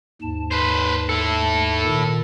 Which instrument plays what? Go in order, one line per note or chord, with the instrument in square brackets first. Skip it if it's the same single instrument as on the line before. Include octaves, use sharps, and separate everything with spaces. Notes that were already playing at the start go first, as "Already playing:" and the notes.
[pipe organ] D#2 G#2 A5
[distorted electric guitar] B4 C5
E4 A4
[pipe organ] A#2 D#3